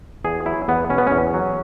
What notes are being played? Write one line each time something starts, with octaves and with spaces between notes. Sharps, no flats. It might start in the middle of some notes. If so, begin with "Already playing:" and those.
E2 G#4
F#3 E4
E2 B3
B2 C#4
B3
E2 C#4
F#3